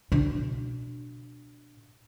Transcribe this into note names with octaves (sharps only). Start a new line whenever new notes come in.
B2 D4